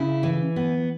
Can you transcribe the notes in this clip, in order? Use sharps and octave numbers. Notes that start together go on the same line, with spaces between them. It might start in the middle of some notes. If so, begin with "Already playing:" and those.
Already playing: C#3 E4
E3
B3